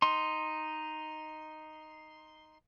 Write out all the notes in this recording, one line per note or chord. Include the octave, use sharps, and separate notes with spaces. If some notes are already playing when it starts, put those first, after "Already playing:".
D#4 C6